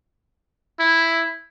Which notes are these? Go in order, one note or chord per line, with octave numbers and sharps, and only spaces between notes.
E4